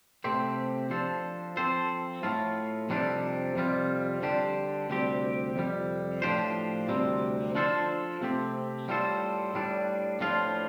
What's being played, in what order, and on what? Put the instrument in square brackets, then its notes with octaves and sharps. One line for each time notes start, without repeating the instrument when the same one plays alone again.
[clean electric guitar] C3 A3 C4 G4 C5
F3 D4 A4 C5
F3 C4 A4 C5
A2 A3 F4
F2 C3 G3 D4
F2 C3 G3 F4
D3 G3 D4 G4 C5
D2 C3 G3 C4 G4
F2 C3 G3
A2 F3 D4 G4 C5
D2 C3 G3 C4
F3 D4 F4 A4 C5
C3 A3 C4 G4
A2 G3 F4 A4 C5
A2 G3 D4
A2 F3 D4 F4